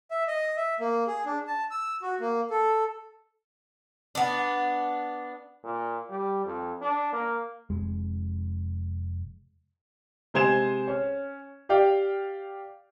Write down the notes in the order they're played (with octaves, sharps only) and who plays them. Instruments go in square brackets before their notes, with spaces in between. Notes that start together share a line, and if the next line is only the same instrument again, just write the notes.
[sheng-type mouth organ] E5
D#5
E5
A#3
G#4
D4
A5
E6
F#4
A#3
A4
[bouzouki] B3 D4
[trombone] A#2
G3
F2
D4
A#3
[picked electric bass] F1 G#3
[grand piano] C3 G#3 C5 G#5 G#6 E7
C#4
G4 D5 F5 G5